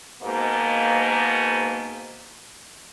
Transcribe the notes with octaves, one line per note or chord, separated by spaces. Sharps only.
G#2 B2 A#3